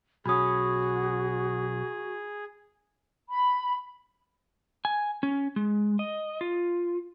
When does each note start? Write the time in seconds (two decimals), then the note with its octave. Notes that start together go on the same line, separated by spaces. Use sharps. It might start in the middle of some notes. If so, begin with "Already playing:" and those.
0.26 B1 C#4 F#4 G#4 B5 D#6
3.30 B5
4.85 G#5
5.23 C#4
5.56 G#3
5.99 D#5
6.41 F4